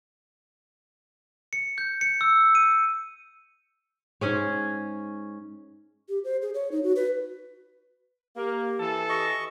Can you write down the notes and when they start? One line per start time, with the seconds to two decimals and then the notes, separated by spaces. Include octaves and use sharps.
1.53 C#7
1.78 G6
2.01 C#7
2.21 E6
2.55 D#7
4.21 G#2 C#4 G#4 C#5
6.09 G4
6.24 C5
6.42 G#4
6.54 C#5
6.72 D#4
6.83 F#4
6.96 B4
8.37 A#3 G4
8.80 E3 A4
9.09 D#5 C#6